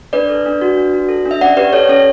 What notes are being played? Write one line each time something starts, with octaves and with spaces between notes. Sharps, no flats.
D4 B4 D5
A4
D4
F#4
D4
F#4
A4
D4
E5
C#4 D5 F#5
G4 B4 D5
G4 A4 C#5
C#4 A4 C#5